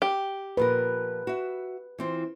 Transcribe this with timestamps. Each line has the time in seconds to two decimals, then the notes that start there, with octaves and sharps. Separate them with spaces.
0.02 G4
0.57 A#2 F3 A#4 B4
1.27 F#4 E5
1.98 E3 C4 F4